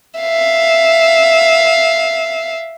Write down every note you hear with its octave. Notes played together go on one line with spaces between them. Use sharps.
E5 F5